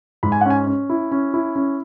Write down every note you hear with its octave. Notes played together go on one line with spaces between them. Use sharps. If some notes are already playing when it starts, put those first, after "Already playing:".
G#2 B5
G#5
F#5
C#4 G#5
C#4
E4
C#4
E4
C#4